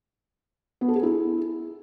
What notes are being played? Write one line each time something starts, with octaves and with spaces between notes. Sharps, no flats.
B3
A4
G#4
E4